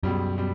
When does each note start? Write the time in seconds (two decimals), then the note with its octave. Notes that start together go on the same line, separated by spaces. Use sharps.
0.03 C#2 F#2 B2 G3
0.38 B2 G3